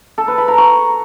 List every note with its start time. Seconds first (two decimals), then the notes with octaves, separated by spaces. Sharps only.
0.18 A4
0.28 B4
0.38 B5
0.48 A#5
0.58 C#6